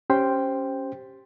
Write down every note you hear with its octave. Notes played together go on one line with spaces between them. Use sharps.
C#4 G4 C5 G5 C6